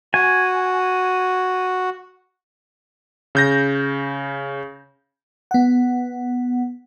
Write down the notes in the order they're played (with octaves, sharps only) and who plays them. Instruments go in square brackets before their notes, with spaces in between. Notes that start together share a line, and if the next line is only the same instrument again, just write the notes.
[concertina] F#4 [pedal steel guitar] G#5
[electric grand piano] C#3 G6 A#6
[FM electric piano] B3 F#5